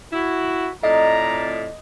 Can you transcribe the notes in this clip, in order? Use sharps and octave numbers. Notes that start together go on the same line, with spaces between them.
E4 F#4
F2 A2 D5 D#5 A#5